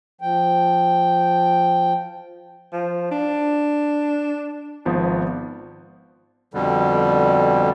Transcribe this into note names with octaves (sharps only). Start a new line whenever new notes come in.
F3 G5
F3
D4
G#1 F3 B3
F2 B2 D3 G3